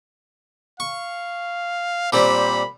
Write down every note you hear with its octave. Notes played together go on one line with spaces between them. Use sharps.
F5 C#6
A#2 G3 C4 C5 B5